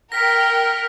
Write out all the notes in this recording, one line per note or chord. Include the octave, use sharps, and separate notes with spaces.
A#4 F#5 G5 F6 A#6 B6